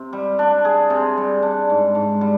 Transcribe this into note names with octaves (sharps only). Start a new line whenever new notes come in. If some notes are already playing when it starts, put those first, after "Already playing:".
Already playing: C3
G3
D4
G#4
C3
G3
D4
G#2
G#2
G3